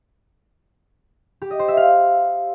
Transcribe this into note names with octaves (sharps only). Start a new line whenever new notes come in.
G4
D#5
C5
E5
F5